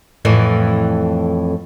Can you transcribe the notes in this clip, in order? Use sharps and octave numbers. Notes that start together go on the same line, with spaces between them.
F2 A2 E3